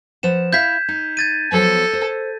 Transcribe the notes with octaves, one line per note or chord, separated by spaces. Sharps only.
F3 B4 F#5 E7
E4 E5 F5 G6 G#6 B6
D#4
G#6 A6 D#7
F3 F#3 B3 A4
C5